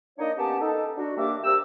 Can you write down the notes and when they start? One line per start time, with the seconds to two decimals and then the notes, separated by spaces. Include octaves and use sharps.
0.19 A#3 D4 D#4 C#5 D#5
0.37 A#3 B3 C#4 G4 A5
0.60 D#4 A4
0.97 D4 F#4
1.17 D#2 G3 A#3 D4 E5 D6
1.44 C3 G4 A#4 E6